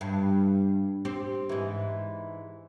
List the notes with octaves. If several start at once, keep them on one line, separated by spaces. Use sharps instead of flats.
G2
C4 G4
G#2 E3